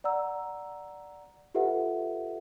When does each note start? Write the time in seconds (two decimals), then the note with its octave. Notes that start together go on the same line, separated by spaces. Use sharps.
0.04 D5 F#5 A#5 E6
1.54 F4 G4 A4 B4 E5 F#5